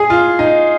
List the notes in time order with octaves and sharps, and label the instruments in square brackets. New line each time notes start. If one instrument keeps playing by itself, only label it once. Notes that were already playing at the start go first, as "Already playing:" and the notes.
Already playing: [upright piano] G#4
F4
D#4